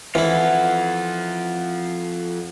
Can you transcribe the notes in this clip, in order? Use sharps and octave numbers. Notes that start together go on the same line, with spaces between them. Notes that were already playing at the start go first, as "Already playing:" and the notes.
F2 E3 E4 F4 F#5